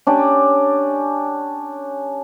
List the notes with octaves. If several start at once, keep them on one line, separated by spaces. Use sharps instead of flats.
C#4 D4 G4